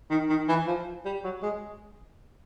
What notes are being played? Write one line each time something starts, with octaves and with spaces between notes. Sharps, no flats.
D#3
D#3
E3
F3
G3
F#3
G#3